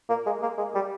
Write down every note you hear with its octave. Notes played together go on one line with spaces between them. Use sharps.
A#3
G#3
A#3
G#3
G3